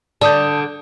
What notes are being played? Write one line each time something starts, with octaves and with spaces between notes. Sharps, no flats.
D3 A4 D5 A5 D#6 G6